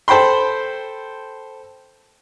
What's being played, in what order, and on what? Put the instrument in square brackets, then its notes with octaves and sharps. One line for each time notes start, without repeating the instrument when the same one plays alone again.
[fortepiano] A4 C5 G5 B5 C6